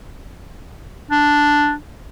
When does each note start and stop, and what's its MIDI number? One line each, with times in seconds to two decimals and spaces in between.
1.11 1.74 62